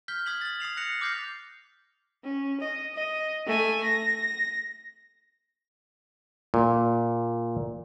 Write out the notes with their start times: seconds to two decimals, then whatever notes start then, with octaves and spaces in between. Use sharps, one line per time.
0.08 F6 G6 B6 G7
0.26 D#6 G#6 B6 F#7
0.41 A6 F#7
0.60 D#6 A6 C7 F7
0.77 F#6 A#6 C#7 F7
1.01 D6 F6 G6 A#6 C7
2.24 C#4
2.61 D#5
2.95 D#5
3.46 A3 G#5
3.84 A#6
6.54 A#2